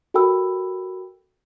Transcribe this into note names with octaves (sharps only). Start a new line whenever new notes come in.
F#4 A4 A#4 G5 B5 E6